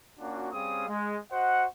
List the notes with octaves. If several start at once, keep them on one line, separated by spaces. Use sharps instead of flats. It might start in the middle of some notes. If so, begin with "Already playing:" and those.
A#3 C#4 D4 F4 F#4
G3 C4 C#4 G#4 F5 D#6
G#3
F#4 C5 D#5 F#5